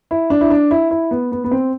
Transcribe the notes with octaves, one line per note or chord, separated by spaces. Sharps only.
E4
D4
E4
D4
E4
E4
B3
B3
B3
C4